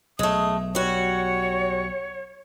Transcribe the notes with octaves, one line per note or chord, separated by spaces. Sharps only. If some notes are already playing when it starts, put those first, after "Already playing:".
B1 G#3 A3 D#6
G3 F#4 C#5